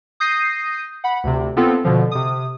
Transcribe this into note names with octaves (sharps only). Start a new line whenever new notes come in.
D#6 G6 A#6 C7 D#7
F#5 B5
D2 C3
B3 C4 F4 A4
B2 D3 F3
C3 D#6